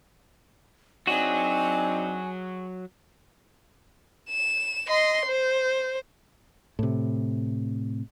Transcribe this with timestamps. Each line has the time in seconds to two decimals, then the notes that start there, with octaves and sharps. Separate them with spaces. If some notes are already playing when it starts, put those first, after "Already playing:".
1.07 F#3 C4 D4 D#4 F#4 G#4 G#5
4.30 E7
4.88 D#5 C6
5.26 C5
6.79 A2 C3